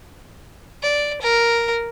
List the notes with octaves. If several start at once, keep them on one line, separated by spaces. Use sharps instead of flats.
D5
A#4